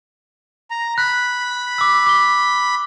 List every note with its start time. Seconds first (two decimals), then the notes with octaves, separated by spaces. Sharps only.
0.71 A#5
0.98 B5 F#6
1.78 D6 E6
2.07 D6 G7